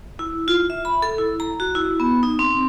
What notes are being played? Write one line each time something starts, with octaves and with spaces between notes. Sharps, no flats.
E4
F4
E5
B5
A4
E4
A#5
F#4
E4
B3
D#4
C4